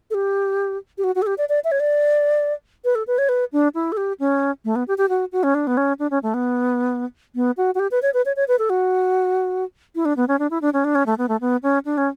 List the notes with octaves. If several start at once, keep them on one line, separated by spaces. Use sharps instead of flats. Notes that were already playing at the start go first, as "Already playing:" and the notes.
A4
G4
G4
F#4
F#4
A4
G4
D5
D5
E5
C#5
D5
B4
A4
B4
C#5
B4
D4
E4
A4
G4
C#4
A3
B3
G4
G4
F#4
F#4
C#4
D4
B3
C#4
D4
C#4
A3
B3
B3
F#4
F#4
G4
B4
C#5
B4
C#5
C#5
B4
A4
F#4
E4
D4
B3
C#4
D4
E4
D4
C#4
D4
C#4
A3
B3
A3
B3
C#4
D4
C#4